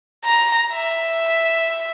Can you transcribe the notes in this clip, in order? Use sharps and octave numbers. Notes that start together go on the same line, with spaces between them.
A#5
E5